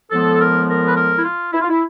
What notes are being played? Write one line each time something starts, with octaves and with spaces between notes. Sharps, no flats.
A2 F3 G#3 B3 A4
A#4
A#4
B4
A#4
E4
F4
E4
F4
E4